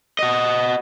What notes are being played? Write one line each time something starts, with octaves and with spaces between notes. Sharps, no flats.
F#4 D#5